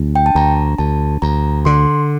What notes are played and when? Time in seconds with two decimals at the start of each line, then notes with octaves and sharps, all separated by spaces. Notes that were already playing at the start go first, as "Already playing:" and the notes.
Already playing: D2
0.16 G5
0.26 A5
0.35 D2 A#5
0.78 D2 A5
1.22 D2 A#5
1.65 D3 C6